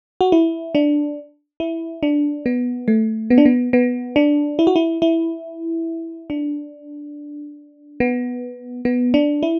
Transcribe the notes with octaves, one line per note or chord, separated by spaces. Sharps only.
F#4
E4
D4
E4
D4
B3
A3
B3
D4
B3
B3
D4
E4
F#4
E4
E4
D4
B3
B3
D4
E4